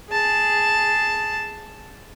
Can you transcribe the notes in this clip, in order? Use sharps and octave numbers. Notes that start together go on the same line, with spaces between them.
G#4 A5